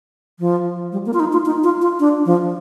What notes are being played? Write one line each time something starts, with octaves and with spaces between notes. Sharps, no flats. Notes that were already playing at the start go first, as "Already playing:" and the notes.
F3
G3
A#3
F4
D#4
F4
D#4
F4
F4
D4
F3